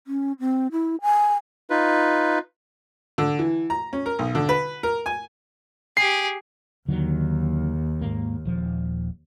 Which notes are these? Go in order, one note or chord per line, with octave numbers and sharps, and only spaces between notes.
C#4
C4
E4
G#5
D#4 F4 B4
D3
E3
A#5
C#4
A#4
B1
D3
B4
A#4
G#5
G4 G#4 C7
D#2 D3 D#3 F#3
G#2 A#3
D#1 F3